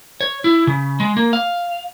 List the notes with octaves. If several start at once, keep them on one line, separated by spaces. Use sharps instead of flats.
C#5
E4
C#3
G#3
A#3
F5